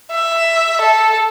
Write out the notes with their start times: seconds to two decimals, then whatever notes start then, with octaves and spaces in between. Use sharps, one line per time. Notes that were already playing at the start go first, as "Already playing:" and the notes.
0.11 E5
0.81 A4